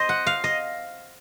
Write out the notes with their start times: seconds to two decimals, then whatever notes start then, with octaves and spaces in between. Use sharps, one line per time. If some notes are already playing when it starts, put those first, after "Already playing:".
Already playing: C5 D#5
0.09 F#5
0.26 F5
0.44 D#5